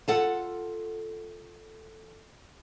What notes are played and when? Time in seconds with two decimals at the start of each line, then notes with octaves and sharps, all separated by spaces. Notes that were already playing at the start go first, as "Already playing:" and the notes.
0.08 F4 A4 F#5